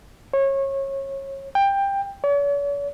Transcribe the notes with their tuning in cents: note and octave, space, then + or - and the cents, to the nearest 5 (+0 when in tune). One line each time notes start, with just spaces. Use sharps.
C#5 -25
G5 +15
C#5 +45